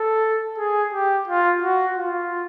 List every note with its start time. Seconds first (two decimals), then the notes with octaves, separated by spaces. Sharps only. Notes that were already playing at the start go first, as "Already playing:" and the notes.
Already playing: A4
0.58 G#4
0.93 G4
1.28 F4
1.62 F#4
1.97 F4